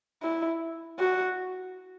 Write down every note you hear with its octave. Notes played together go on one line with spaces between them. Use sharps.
E4
F#4